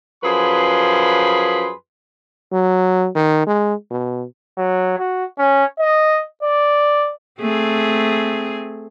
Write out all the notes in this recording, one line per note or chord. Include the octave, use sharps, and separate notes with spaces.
F#2 F3 G#4 B4 B5 C6
F#3
D#3
G#3
B2
F#3
F#4
C#4
D#5
D5
A3 C4 G#4